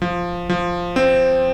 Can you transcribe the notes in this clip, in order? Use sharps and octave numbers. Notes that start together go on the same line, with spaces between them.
F3
F3
C4